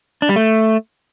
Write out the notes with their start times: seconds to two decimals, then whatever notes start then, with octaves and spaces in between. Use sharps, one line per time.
0.22 D4
0.29 G3
0.36 A3